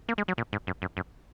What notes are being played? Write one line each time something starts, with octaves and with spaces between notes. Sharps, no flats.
A#3
G#3
F#3
A#2
G#2
F#2
F#2
F#2